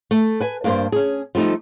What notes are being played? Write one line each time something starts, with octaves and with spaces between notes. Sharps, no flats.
A3
B4 G#5
G2 A#3 D4 G4 C5
C#4 G#4
F3 G3 A3 D#4